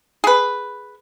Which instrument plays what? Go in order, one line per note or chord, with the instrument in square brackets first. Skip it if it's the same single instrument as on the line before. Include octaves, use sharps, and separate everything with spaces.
[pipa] G#4 B4